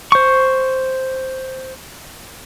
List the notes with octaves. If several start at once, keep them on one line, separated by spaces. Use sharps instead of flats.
C5 C#6